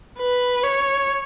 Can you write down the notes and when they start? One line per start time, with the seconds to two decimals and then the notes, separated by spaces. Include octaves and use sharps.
0.18 B4
0.63 C#5